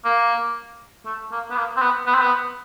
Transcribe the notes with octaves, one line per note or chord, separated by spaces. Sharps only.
A#3
A3
A#3
B3
A#3
C4
B3
B3
C4
B3